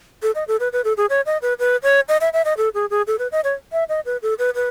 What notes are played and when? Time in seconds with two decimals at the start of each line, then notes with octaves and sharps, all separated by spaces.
0.22 A4
0.35 D#5
0.48 A4
0.60 B4
0.73 B4
0.84 A4
0.97 G#4
1.09 C#5
1.26 D#5
1.42 B4
1.59 B4
1.83 C#5
2.08 D#5
2.21 E5
2.33 E5
2.45 D#5
2.57 A4
2.74 G#4
2.90 G#4
3.07 A4
3.19 B4
3.32 D#5
3.44 C#5
3.72 E5
3.89 D#5
4.05 B4
4.22 A4
4.39 B4
4.55 B4